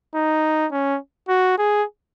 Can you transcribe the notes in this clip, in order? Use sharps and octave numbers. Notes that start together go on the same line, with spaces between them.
D#4
C#4
F#4
G#4